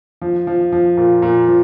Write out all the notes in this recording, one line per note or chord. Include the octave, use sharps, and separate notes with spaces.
F3
F3
F3
A#2
A#2
F3